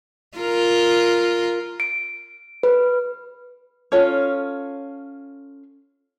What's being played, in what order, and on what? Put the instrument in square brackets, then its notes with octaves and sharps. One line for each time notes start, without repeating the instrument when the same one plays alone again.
[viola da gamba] F4 A#4
[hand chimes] D7
B4
[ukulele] C#4 F4 A4 C#5